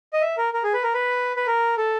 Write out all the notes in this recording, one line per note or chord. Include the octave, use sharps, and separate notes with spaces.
D#5
E5
A#4
A#4
G#4
B4
A#4
B4
B4
A#4
A4